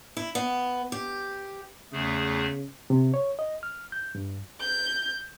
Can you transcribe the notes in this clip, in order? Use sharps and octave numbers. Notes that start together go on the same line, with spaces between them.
E4
B3
G4
E2 C#3 A3 G#4
C3
C#5
D#5
F6
G6
G2
G6